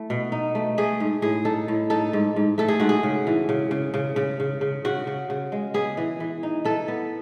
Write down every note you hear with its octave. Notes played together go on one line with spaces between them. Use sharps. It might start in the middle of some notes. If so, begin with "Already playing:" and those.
Already playing: A3 E4
B2
D#4
A3
A3 G#4
G#2
A2 G#4
D#4 A4
A2
D#4 A4
G#2
G#2
A3 A4
G#4
G#2 F#4
G#4
C#3
E3
C#3
C#3
C#3
C#3
C#3
C#3
C#3 F#4
C#3
C#3
G#3
B3 G#4
E3
E3
D#4
E3 A4
B3